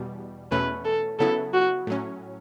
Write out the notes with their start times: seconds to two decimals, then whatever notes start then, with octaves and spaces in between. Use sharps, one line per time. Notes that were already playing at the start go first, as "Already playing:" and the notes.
Already playing: E2 B2 G3
0.51 E2 B2 A3 C#4 B4
0.85 A4
1.19 C#3 F#3 B3 E4 A4
1.54 F#4
1.87 A2 F#3 C#4